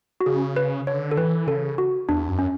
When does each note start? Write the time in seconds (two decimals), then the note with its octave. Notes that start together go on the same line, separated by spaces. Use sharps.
0.21 F#4
0.26 C#3 G#4
0.56 B4
0.87 D3 C#5
1.11 A4
1.17 E3 B4
1.47 C#3 A4
1.78 F#4
2.09 E2 D4
2.29 F#2
2.39 C#4